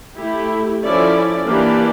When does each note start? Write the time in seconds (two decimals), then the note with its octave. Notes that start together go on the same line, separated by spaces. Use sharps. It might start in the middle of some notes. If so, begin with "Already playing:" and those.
0.18 A3 E4 G4
0.83 F3 C#4 E4 A4 D5
1.48 E3 A#3 D4 G4 D5